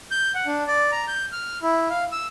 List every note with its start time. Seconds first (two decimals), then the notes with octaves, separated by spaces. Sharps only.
0.11 G6
0.35 F#5
0.46 D4
0.67 D5
0.92 A#5
1.08 G6
1.32 F6
1.62 E4
1.90 F5
2.12 E6